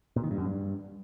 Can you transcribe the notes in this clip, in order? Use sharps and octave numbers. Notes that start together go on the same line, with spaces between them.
A#2
D#3
G2
F#2
G2